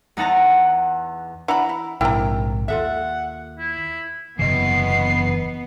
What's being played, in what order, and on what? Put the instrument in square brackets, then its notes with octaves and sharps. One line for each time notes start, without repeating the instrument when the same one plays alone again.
[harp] E2 D#4 F#5 A5 A#5 F#6
[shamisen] E3 D4 [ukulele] F#5 A#5 B5
[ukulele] E4
[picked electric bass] A#1 G#2 C3 [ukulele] D4 A#4 G5 [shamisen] E4 A#5
[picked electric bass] D#2 [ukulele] F4 A4 E5 [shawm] F#5
[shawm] E4
[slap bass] F#1 E2 C3 [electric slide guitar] E3 D#5 [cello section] B3 [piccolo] C7